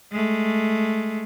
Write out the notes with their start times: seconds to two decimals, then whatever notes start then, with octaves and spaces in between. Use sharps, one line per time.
0.12 G#3 A3